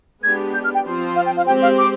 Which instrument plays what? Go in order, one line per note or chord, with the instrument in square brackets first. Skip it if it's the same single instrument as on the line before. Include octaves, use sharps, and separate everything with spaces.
[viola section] G#3 B3 D4 G4 [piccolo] G#6
[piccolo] G6
F6
G5
[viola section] F3 C4 F4 C5
[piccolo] F5
G5
F5
[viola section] G#3 C4 G4 C5 [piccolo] G5
[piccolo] F5
D6